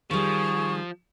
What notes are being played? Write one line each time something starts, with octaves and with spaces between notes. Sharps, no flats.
D#3 F3 G3 G#4 C#6